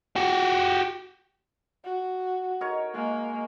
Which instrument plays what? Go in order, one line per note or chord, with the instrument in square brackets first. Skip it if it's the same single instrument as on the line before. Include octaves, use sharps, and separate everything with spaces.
[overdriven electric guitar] F#4 G4
[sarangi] F#4
[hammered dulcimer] D#4 A#4 C#5
[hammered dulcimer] G#3 [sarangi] A#3